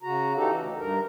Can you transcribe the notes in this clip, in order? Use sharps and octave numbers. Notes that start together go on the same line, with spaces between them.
C#3 F#4 A#5
E3 D#4 F#4 G4 A4
D2
G2 A#4